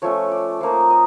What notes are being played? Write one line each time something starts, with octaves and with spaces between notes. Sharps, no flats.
F3 A3 C#4 C#5
D5
F3 A#3 D#4
D#5